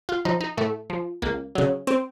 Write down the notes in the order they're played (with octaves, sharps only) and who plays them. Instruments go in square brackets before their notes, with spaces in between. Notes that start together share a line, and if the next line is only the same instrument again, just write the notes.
[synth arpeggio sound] F4
F3 D#4
D#4
A2 A3
F3
C#2 A#3
C#3 F#3
C4